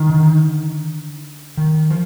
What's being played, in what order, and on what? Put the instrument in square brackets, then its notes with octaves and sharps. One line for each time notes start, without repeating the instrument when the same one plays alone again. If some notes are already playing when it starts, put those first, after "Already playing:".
Already playing: [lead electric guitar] D#3
[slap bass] D3
D#3
F3